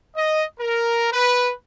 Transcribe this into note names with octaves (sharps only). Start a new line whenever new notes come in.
D#5
A#4
B4